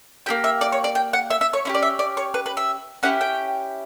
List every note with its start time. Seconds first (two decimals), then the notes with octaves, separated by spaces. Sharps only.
0.26 A#3 E4 G4 G5
0.44 E5
0.61 D5
0.72 C#5
0.84 D5
0.95 G5
1.13 F#5
1.30 E5
1.41 E5
1.53 C#5
1.65 C#4 E4 G4
1.75 D5
1.83 E5
1.99 D5
2.17 C#5
2.34 B4
2.46 B4
2.57 E5
3.03 C#4 E4 G4 F#5
3.21 G5